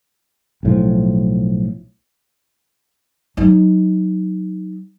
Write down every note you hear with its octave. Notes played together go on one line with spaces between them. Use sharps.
B1 A2 F3
F#3 D#4